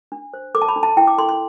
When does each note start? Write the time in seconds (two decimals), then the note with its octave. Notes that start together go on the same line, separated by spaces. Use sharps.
0.12 D4
0.34 C5
0.55 A4 D6
0.62 A5
0.69 B5
0.76 D4
0.83 A5
0.97 E4 G5
1.07 D6
1.18 A4 C6
1.29 C6